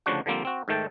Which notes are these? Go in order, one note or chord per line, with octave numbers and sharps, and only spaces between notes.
D2 C#3 F3 D4 F#4 F#5
D3 F3 G3 A#3 C4
C4 F#4
G#2 D#3 A3 G5 A5